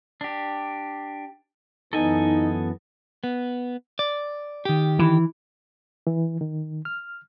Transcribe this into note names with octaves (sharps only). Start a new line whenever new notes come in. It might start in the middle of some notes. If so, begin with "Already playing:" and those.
D4 G4
F#2 E3 B3 D#4 A4 D#5 G#5
B3
D5
D#3 G4
E3
E3
D#3
F6